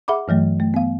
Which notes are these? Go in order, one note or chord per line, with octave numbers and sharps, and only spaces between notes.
G#4 E5 F#5 B5 D6
G2 E3 F#3 A3
A3
B3 F5